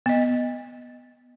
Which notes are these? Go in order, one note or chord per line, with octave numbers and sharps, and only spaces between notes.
B3 D#5